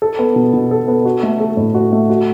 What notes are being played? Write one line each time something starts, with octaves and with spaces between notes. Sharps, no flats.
A4
B3
B2
B2
A4
B3
F#4
A3
A4
A2
F#4
A3
F#4